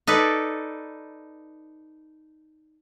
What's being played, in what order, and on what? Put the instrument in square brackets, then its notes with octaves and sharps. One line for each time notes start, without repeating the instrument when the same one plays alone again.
[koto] D#4 A4 B4 D5